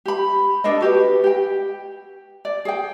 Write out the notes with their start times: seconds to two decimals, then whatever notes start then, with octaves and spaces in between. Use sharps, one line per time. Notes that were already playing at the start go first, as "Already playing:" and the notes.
0.05 G4 B5
0.64 D4 A4 A#4 D#5
0.80 F#4 G4 B4
1.24 G4 G5
2.45 D5
2.65 G#4 G5